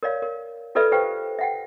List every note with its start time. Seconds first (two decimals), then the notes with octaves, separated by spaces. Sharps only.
0.03 A#4 C#5 D5 F5
0.22 A#4
0.75 F4 A4 B4 D5 E5
0.92 G4 B4 C5 F5 G5
1.39 E5 F#5 G5